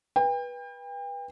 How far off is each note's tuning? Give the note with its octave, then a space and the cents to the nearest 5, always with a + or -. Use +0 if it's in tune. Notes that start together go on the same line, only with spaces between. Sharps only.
B4 -20 G5 +35